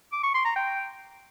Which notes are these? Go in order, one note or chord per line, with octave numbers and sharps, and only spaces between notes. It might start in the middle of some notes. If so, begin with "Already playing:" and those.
D6
C#6
C6
A#5
G5